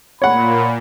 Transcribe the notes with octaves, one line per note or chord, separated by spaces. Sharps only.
A#2 C#5 F#5 B5